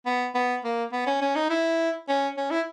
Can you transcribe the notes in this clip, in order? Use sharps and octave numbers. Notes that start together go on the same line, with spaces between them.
B3
B3
A#3
B3
C#4
C#4
D#4
E4
C#4
C#4
E4